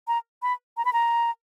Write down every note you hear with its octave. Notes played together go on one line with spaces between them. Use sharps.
A#5
B5
A#5
B5
A#5